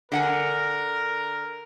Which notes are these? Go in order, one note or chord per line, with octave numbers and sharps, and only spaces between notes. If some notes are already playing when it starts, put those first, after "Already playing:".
D3 A#4 F#5 G#5